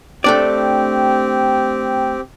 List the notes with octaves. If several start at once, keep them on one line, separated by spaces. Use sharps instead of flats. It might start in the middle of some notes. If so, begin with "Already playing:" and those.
A3 C4 D4 G4 D5